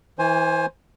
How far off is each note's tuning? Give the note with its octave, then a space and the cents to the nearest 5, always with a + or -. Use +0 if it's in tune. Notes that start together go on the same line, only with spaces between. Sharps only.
E3 -15 C5 +15 G#5 +5